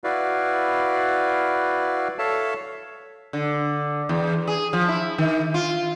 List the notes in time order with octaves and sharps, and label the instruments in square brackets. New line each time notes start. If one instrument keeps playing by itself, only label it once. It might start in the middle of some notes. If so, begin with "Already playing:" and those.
[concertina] E4 F#4 B4 D5 F5
A4 C#5 E5 F5 A5
[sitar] D3
E2
G#4
F3
E4
D#3
F4